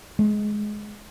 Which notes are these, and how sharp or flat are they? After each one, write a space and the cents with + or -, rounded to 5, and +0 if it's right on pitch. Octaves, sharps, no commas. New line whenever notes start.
G#3 +15